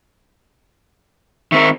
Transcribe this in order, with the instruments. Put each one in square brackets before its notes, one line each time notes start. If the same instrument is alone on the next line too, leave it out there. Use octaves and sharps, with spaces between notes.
[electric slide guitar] D#3 C4 A#4 [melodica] E5 C#6